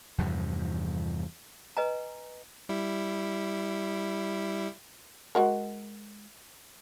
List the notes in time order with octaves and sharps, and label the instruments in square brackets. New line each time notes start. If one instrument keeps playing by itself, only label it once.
[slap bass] E2 G2 C3 F3
[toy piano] B4 D#5 G#5 A#5
[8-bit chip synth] G3 E4
[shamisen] G#3 F#4 A#4